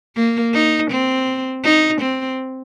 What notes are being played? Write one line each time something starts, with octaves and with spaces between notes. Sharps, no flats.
A#3
D#4
C4
D#4
C4